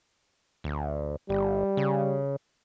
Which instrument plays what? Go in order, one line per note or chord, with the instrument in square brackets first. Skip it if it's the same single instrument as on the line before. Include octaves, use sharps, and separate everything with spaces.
[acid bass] D2
[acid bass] G1 [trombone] G3
[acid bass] C#3